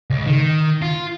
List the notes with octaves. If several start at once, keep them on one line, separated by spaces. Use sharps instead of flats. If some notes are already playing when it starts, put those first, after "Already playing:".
C#2
D#3
F4